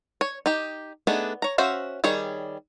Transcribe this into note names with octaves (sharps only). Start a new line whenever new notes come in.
C#5
D#4 G4
A3 B3 D4 D#4 G#4
C#5 A#5
C#4 F#4 C5 E5 F5
D#3 G3 G#4 C#5